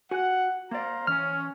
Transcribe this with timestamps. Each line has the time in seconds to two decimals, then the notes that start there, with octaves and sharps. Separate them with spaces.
0.11 F#4 F#5 G#5
0.71 A#3 C5 D5 F5 A#5
1.07 E3 C#4 F6